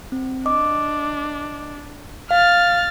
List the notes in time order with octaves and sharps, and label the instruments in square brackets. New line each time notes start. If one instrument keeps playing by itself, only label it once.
[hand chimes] C4
[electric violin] D4 [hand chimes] D#5 D6
[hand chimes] F5 [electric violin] F6 A6